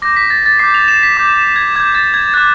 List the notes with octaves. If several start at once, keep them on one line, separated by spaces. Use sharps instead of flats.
D6 G6 A#6
B6
A6
A6
D6 G6 C7
F7
E7
B6
D6 G6
G#6
D6 G6 G#6
A6
G#6
D6 F#6 A6